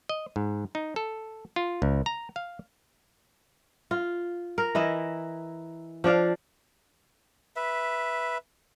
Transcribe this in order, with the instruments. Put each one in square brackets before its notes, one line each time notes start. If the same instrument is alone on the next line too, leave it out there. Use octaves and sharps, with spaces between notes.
[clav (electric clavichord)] D#5
G#2
D#4
A4
F4
C#2
A#5
F5
[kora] F4
A#4
E3 E4 D#5 E5
F3 D4 D5 F5
[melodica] B4 E5